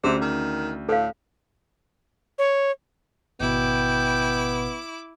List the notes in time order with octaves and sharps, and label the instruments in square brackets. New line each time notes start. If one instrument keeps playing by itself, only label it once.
[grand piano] D2 [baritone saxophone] C3 [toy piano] C#4 G#4
[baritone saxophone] D#3
[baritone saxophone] A2 [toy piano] A4 F5
[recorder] C#5
[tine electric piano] G#1 B2 [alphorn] B3 [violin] E4 D6 [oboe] G5